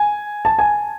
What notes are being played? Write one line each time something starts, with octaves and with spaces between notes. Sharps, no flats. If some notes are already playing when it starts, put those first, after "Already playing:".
Already playing: G#5
A5
G#5